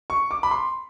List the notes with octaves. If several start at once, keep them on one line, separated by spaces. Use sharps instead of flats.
C#6
D6
B5
C6